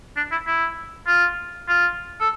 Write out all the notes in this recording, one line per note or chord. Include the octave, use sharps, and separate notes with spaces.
D4
E4
E4
F4
F4
A4